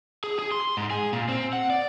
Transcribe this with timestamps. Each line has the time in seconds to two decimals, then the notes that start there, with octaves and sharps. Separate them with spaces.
0.24 G#4
0.39 G#4
0.52 C6
0.77 G#2
0.90 G#4
1.13 A#2
1.29 C4
1.53 F#5
1.70 D5